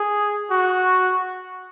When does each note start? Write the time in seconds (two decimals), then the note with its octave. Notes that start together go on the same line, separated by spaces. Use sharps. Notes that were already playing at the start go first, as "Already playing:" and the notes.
Already playing: G#4
0.50 F#4